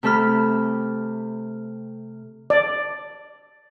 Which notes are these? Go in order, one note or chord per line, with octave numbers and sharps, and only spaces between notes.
C3 A3 A4 B5 F6
D5